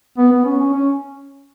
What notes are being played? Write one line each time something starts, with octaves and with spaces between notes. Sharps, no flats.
B3
B3
C#4
C#4
C#4